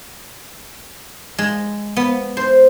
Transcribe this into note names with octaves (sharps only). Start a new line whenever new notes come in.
G#3
B3
C5